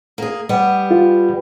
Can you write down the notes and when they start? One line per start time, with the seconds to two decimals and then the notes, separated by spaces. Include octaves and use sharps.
0.18 A#3 G#4
0.49 G3 B3 G4
0.91 F4